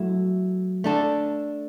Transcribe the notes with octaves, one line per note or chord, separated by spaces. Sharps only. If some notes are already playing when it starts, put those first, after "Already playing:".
Already playing: F#3 A3 E4
A3 D4 A4